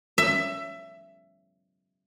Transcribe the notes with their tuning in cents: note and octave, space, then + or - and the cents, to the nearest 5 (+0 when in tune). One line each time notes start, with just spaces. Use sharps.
E5 +20